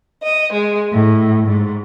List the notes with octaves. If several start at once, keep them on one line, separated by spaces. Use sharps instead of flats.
D#5
G#3
A2
G#2